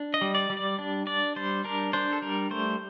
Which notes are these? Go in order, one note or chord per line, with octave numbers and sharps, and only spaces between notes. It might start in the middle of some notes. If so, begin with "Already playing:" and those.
Already playing: D4
D#5
G3
D5
G3
D5
D4
D4 D5
G3 C5
D4 A#4
D4 C5
A4
G3 A#4
A3 C5